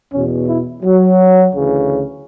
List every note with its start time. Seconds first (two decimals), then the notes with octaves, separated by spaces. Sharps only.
0.12 E2 B2 C#4
0.47 E4
0.83 F#3
1.53 D2 C#3 E3